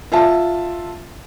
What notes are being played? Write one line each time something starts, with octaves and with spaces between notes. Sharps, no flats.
F4 E5 A5